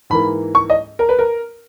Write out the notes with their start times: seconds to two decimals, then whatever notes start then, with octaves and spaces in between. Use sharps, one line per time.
0.10 G#2 E3 A#3 B5
0.55 C#6
0.70 D#5
0.99 A#4
1.09 B4
1.19 A#4